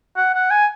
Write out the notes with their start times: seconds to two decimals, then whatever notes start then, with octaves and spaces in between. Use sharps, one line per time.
0.17 F#5
0.34 F#5
0.51 G#5